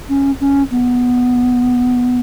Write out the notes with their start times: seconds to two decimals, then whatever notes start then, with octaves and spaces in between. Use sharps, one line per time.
0.09 C#4
0.41 C#4
0.71 B3